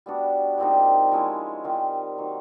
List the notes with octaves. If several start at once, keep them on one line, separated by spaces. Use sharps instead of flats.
G3 B3 D4 F#4
A#2 G3 C4 D#4
F3 G#3 C#4 E4
D#3 G3 C4 F4
D#3 F#3 A#3